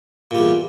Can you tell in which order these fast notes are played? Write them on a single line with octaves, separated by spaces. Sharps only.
A#2 G3 E2